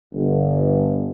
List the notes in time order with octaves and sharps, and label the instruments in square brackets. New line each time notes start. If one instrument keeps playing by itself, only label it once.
[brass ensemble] G1